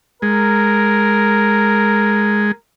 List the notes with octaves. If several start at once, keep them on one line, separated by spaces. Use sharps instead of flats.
G#3 A#4